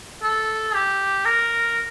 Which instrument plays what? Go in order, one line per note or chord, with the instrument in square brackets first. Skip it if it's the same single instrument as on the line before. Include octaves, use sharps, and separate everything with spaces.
[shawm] A4
G4
A#4